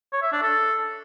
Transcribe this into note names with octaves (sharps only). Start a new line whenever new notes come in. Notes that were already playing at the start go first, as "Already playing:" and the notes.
C#5
E5
D4
A4